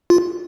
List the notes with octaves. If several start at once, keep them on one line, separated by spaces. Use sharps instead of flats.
F4